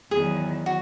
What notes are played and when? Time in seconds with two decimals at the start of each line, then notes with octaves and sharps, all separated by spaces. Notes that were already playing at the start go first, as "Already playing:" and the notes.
0.11 E2 D#3 F#3 G#4
0.66 F#4